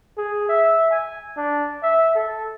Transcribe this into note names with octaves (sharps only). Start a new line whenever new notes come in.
G#4
E5
G#5
D4
E5
A4